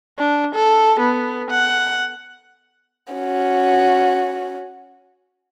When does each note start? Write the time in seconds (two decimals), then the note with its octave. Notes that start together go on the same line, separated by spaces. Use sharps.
0.18 D4
0.55 A4
1.00 B3
1.50 F#5
3.13 C#4 F#4